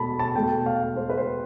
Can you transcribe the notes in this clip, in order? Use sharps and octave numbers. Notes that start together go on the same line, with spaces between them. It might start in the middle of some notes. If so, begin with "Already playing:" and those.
Already playing: B2 A3 A5 B5
A5
B2 A3 G5
F5
C5
B4
C5